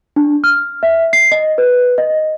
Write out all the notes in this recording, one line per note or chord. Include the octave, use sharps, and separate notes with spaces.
D4
F6
E5
C7
D#5
B4
D#5